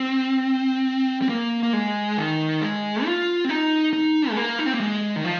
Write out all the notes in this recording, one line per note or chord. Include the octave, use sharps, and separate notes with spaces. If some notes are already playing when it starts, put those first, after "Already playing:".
Already playing: C4
C4
A#3
A#3
G#3
D#3
G#3
F4
C4
D#4
D#4
G#3
A#3
D#4
C4
A#3
G#3
D#3
F3